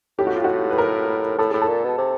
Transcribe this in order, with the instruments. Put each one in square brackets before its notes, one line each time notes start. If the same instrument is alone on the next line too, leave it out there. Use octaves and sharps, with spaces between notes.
[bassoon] A2 [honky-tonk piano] G4
[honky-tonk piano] F#4
F4
F#4
B4
A#4
[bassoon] A2 [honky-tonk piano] A4
[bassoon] A2 [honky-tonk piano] G#4
[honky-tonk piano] A4
[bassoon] A#2
B2
C3